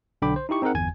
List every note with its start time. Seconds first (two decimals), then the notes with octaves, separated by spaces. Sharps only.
0.22 B1 D3 D4 G5 B5 D6
0.36 C5
0.49 D#4 E4 G4 C#6
0.62 C4 D#4 G#4 A#4 F#5
0.74 G1 E2 G#5 G#6